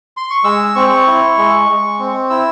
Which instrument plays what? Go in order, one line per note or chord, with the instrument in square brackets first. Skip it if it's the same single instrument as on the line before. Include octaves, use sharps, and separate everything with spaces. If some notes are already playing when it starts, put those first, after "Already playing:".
[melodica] C6
C#6
G#3 E6
E6
C4 C#6
E4
G#3
G#3
C4
E4 E6